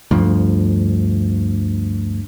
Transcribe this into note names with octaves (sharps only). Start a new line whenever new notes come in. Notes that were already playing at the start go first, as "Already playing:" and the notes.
D2 G2 F3